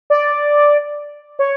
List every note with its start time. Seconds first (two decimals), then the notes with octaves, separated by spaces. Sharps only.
0.10 D5
1.39 C#5